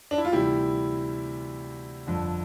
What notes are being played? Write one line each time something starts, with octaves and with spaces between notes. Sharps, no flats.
D4
E4
F4
D2 C3 E3 G3 E4 G4
G1 F2 D3